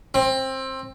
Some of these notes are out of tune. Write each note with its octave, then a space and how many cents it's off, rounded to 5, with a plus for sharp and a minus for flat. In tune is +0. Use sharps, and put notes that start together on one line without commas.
C4 +20